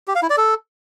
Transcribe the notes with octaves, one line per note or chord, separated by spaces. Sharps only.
G4
F5
E4
D5
A4